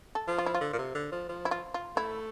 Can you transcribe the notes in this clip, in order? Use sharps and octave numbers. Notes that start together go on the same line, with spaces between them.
A4
F3
F4
E4
F4
D3
A#2
C3
D3
F3
F3
E4
F4
F4
A3 E4